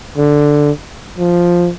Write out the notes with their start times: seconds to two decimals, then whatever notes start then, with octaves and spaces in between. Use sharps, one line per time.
0.18 D3
1.18 F3